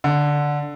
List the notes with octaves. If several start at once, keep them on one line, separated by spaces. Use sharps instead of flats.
D3